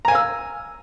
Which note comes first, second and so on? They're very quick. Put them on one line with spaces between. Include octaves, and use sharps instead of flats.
A#5 G#5 F5 E6